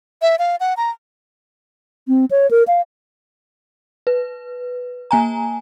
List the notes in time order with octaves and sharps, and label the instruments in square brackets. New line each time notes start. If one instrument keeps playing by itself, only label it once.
[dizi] E5
F5
F#5
A#5
[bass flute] C4
C#5
A#4
F5
[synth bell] B4
A#3 G#5 A#5